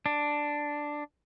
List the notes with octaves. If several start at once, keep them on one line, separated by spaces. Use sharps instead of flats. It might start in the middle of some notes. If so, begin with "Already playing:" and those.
D4